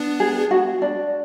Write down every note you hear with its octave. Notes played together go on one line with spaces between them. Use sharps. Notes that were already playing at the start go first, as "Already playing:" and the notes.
Already playing: B3 D4
G#4
F#4
D4